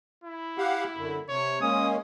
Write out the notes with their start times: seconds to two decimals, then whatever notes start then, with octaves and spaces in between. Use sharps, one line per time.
0.24 E4
0.58 G4 F5 F#5
0.97 F#2 D3
1.29 C3 C#5
1.61 G#3 A#3 C#4 D#6